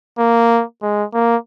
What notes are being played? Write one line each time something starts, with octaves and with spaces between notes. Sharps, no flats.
A#3
G#3
A#3